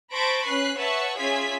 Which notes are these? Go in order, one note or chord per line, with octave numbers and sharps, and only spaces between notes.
C5 A5 B5 C#6 A#6 D7
C#4 B4 F#6 C7
B4 C#5 E5 F#5 A5 C#6
C#4 F4 G#4 E5 G#6 B6